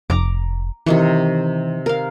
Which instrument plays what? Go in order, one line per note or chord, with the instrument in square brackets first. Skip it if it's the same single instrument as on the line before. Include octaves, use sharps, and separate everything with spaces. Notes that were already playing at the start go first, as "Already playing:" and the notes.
[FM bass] F1 [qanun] A#5 D6
[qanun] C3 D#3 C#6 [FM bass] E3
[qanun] A#4 F5